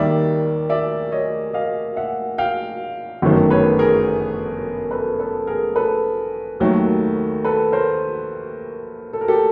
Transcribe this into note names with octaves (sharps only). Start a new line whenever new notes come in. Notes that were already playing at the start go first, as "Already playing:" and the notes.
Already playing: D#2 D#3 G3 D5 E5
D5 E5
C#5 D#5
D#5 F5
E5 F#5
F5 G5
G1 F#2 D#3 F#3 A3
B4 C#5
G#4 A#4
A4 B4
A4 B4
G#4 A#4
A4 B4
D#2 D#3 F#3 A3
A4 B4
A#4 C5
A4
A#4
G4 A4